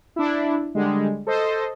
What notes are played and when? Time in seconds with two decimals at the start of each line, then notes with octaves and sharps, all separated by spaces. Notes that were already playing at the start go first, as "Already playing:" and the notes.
0.16 D4 E4
0.75 D3 G3 G#3
1.27 A4 C5 D#5